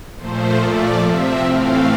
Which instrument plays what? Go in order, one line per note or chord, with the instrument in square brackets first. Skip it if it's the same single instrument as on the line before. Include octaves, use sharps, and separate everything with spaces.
[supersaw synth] A#2 F3 A3 C5
A#2 F3 A3 D5
C3 F3 C4 E5
A2 E3 A3 C4 F5